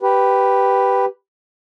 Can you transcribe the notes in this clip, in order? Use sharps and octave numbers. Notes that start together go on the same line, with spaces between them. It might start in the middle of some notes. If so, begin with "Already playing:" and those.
G4 B4